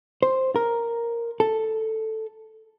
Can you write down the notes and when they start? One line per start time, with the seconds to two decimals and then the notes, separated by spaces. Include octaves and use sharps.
0.23 C5
0.56 A#4
1.40 A4